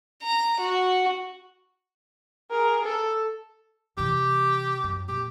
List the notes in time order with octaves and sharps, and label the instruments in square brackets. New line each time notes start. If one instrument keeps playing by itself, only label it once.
[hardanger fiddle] A#5
F#4
[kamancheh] G#4 A#4
A4
[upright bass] C3 E3 [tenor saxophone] G4
[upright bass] F#2
[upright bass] A#2 [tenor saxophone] G4